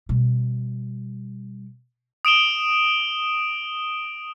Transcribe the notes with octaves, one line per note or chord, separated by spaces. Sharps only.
B2 G3
D#6 D7 E7 G7